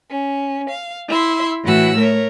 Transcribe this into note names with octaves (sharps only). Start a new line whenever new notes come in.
C#4
F5
E4 E5 C6
A2 E3 F#4 F#5 E6
A3 A#4 C#5